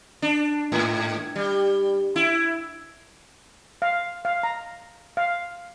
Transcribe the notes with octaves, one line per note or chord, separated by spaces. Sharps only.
D4
G#2
G3
E4
F5
F5
A#5
F5